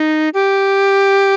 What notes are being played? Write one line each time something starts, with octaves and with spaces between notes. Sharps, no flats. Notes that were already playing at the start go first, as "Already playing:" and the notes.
Already playing: D#4
G4